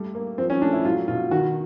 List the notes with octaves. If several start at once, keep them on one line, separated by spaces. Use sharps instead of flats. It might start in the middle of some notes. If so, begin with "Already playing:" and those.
Already playing: G3 A3
A#3
F3 C4
C#4
A3 D4
E4
F#3 F4
B2 F4
D#3 F#4